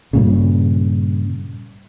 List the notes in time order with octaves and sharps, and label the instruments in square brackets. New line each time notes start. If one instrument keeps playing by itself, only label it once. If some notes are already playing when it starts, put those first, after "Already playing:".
[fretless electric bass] G2 A#2 C#3